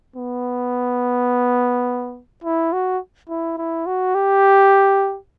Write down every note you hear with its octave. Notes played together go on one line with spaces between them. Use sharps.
B3
E4
F#4
E4
E4
F#4
G4